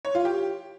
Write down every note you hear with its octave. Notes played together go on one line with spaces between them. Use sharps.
C#5
F4
G4